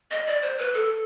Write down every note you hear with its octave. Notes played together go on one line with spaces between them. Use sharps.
D#5
D5
C5
B4
A4